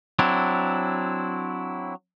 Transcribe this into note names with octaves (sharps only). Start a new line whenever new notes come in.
F#3 C4 D4 E4